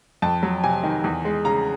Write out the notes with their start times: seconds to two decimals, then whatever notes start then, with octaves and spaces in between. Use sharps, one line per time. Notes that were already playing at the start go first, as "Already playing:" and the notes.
0.22 F2 A5
0.43 F#3
0.64 C3 G#5
0.83 D#3
1.04 E2
1.25 G#3
1.45 C#3 A#5